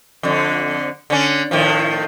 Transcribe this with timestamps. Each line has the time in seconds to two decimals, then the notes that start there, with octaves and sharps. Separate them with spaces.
0.23 F2 D3
1.10 D3 C#4
1.51 A2 D#3 F3